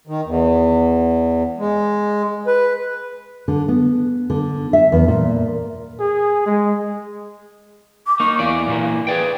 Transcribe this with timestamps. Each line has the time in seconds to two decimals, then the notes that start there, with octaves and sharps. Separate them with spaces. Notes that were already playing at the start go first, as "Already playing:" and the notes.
0.07 D#3
0.26 E2
1.58 G#3
2.47 B4
3.48 D3
3.68 B3
4.30 D3
4.73 E5
4.92 E2
5.08 A#2
6.00 G#4
6.46 G#3
8.07 D6
8.20 A#3 D#4 C#6
8.39 E2 E3 D5 F5
8.68 A#2 E3 A#3
9.07 G#4 B4 D5 G5